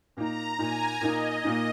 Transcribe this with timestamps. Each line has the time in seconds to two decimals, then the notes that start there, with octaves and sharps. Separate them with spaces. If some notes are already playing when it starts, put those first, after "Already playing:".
0.16 A#2 A#3 D#4 A#5
0.58 A#2 A#3 D#4 G#5
1.01 A#2 A#3 D#4 D#5
1.44 A#2 A#3 D#4